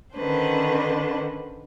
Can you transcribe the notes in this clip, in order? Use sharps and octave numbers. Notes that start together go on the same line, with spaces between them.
D3 D#3 C#4 D4 B4 C5